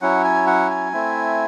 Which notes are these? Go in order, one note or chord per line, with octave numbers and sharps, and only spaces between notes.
F#3 C#4 E4 F#5
G#5
F#5
G#5
A3 C4 E4